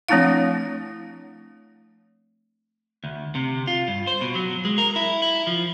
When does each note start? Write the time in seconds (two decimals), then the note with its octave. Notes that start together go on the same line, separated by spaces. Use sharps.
0.08 F3 A3 C4 D4 E4 F5
3.04 D2
3.35 C3
3.67 F4
3.88 G2
4.07 C5
4.21 B2
4.35 F#3
4.65 G#3
4.78 A#4
4.96 E4
5.22 E4
5.47 F3